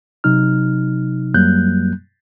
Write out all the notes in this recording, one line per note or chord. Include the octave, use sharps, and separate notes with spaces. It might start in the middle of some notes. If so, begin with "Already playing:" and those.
C3 F#3 D#4 F6
F#2 F#3 G3 A#3 F#6 G6